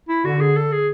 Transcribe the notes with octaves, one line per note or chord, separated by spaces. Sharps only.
E4
D3 F#4
G#4
A4
G#4